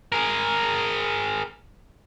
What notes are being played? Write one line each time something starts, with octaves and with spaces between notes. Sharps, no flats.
G#4 A#4